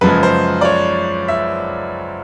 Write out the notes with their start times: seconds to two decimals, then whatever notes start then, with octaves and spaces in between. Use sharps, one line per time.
0.01 F#2 C#3 F3 G#3 B4
0.23 C5
0.61 D5
0.65 C#5
1.28 E5